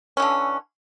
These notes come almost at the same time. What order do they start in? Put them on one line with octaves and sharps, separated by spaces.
C#4 E3 D3